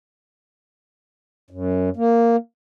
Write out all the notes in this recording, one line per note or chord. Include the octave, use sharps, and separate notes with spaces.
F#2
A#3